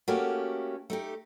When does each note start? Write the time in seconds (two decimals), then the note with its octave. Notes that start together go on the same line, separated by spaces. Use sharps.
0.08 A3 A#3 C#4 F#4 G4
0.90 A3 D#4 G4